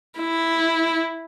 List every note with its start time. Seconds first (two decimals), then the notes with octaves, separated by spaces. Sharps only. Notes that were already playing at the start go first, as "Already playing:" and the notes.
0.19 E4